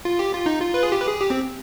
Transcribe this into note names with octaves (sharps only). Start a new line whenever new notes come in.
F4
G4
F4
D#4
F4
B4
G#4
G4
B4
G#4
G4
C4